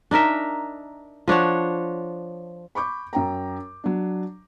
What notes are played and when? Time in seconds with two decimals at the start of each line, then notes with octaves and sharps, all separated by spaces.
0.11 D4 D#4 A#4 E5
1.28 F3 D4 C#5 F#5
2.75 B5 C#6 D6 G6
3.13 F#2 G5 A#5
3.84 F#3 D4